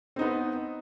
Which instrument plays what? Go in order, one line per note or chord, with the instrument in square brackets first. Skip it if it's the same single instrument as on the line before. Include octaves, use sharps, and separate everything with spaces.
[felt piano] C4
D#4
B3